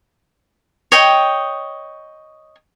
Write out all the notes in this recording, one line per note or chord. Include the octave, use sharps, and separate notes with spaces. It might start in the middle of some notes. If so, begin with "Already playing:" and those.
C#5 D#5 G5